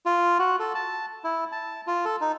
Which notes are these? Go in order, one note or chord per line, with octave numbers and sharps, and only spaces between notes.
F4
F#4
A4
A5
E4
A5
F4
A4
D#4